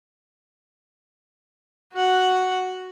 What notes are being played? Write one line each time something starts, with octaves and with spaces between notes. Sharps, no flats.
F#4 F#5